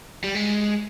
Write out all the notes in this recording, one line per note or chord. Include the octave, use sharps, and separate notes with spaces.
G3
G#3